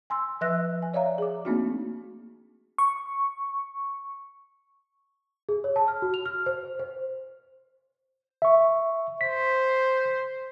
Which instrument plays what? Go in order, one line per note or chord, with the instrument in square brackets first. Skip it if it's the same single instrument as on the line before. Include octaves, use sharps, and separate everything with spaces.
[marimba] G#5 C6 E6
F3 B4 E5 E6 F#6 A#6
G#5
C#5 D5 E5 F5 A#5
G#4 D6
A3 A#3 C4 D4 D#4 F#4
[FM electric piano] C#6
[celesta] G#4
C#5
A5
F6
F#4
F7
F6
C5
C5
[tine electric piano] E5 C#6
[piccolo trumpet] C5 [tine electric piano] B6